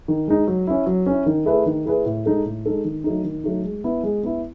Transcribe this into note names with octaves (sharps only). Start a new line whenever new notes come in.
D#3
G#3 D#4
F#3
C#4 E4
F#3
C#4 E4
D#3
A3 E4 G#4 B4
D#3
A3 E4 G#4 B4
A2
G#3 D#4 A4
A2
G#3 D#4 A4
D#3
F#3 A3 D#4
D#3
F#3 A3 D#4
G#3
B3 E4
G#3
B3 E4